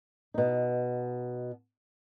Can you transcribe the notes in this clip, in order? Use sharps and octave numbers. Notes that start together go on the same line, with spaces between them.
B2 D#4